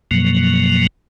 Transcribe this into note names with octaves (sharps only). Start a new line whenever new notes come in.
F#2 B2 F3 F#3 A#3